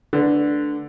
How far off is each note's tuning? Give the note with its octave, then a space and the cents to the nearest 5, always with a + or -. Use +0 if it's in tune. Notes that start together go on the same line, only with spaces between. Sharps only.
D3 +0 A3 +0 B4 +0